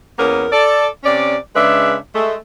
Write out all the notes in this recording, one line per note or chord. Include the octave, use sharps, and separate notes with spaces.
E2 A#3 B3 C#4 A#4
A4 D5
C3 C#4 D5
C#3 G#3 D4 B4 E5
G#3 A3